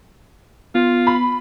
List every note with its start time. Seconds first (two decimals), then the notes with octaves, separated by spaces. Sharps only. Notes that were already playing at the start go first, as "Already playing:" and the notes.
0.75 B3 F4
1.07 B5